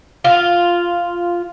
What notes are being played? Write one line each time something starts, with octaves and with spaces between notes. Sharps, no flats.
F4